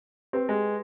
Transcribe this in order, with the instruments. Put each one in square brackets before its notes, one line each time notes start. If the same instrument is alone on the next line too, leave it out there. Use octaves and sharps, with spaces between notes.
[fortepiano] C4 [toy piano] G4 B4 G5
[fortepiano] G#3